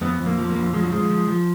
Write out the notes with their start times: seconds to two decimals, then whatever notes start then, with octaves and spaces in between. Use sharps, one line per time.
0.01 F2 B3
0.20 F2
0.26 A#3
0.38 F3
0.50 A#3
0.56 F2
0.73 F3 G#3
0.83 F#3
0.92 F3 G#3
1.10 F3
1.27 F3